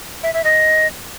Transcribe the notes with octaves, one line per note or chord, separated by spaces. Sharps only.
E5
E5
D#5